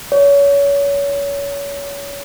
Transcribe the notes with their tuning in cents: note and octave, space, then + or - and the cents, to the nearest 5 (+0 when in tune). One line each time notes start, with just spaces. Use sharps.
C#5 +30